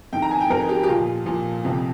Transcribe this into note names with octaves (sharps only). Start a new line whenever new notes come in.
F2 D#3 G5
A#5
G#5
G5
F2 D#3 A#4
G4
G4
A#2 F3 F4
A#2 F3
F2 C3 F3